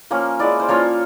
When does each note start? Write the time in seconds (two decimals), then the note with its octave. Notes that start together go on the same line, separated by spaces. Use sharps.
0.11 F3 A#3 C#4
0.39 G#3 C#4 E4 D5
0.60 C5
0.69 F3 A#3 C#4 F4 C#5